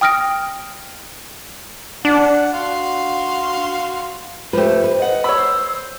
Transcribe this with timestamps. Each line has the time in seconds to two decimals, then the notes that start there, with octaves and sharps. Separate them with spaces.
0.01 G5 D#6 F6 A#6 D7
2.05 D4 F#5
2.54 F#4 F5 C6
4.53 F3 A3 G4 B4 C5
4.84 B4
4.99 D#5 F#5
5.24 C#5 B5 E6
5.38 C5